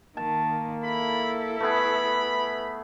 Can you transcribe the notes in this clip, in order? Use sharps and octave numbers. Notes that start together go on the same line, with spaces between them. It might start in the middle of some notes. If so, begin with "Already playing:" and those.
D#3 A#3 A5
E4 A4 B5
A3 B3 G#4 B4 B5